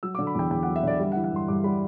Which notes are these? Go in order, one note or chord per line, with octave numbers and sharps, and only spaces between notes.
F#3 E6
D6
D3
B5
E2 G5
E2 G5
F#5
F#3
E5
D3 D5
G3 E5
F#5
E3
F#5
G2 C6
G2 D6
G3 B5